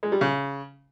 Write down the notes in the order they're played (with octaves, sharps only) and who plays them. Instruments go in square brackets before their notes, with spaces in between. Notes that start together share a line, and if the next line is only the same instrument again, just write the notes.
[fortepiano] G#3
G3
C#3